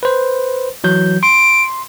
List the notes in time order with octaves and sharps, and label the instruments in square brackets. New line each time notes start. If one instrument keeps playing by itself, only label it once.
[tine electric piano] B4 C5
E3 F#3 G6
[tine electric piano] C6 [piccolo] D7